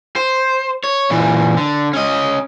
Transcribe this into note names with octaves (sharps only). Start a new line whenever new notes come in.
C5
C#5
A#2 E3
D3
C#4 D#5